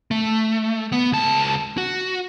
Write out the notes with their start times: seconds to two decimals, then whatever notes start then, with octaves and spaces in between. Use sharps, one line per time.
0.11 A3
0.92 B3
1.12 C#2 A5
1.78 F#4